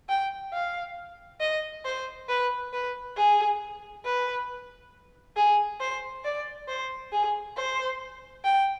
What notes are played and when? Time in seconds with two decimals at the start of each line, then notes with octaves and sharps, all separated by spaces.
0.09 G5
0.53 F5
1.41 D#5
1.85 C5
2.29 B4
2.73 B4
3.17 G#4
4.05 B4
5.36 G#4
5.80 C5
6.24 D5
6.68 C5
7.12 G#4
7.57 C5
8.44 G5